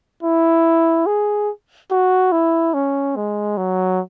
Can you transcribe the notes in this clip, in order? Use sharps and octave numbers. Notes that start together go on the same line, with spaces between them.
E4
G#4
F#4
E4
C#4
G#3
F#3